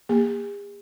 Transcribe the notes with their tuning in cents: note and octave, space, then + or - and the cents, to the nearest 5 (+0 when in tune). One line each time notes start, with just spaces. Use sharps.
A#3 +0 G#4 -45